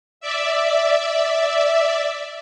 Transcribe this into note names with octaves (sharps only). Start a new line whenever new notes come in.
D5 E5